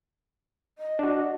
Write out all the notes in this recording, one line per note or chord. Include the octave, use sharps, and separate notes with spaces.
D#5
D4 F#4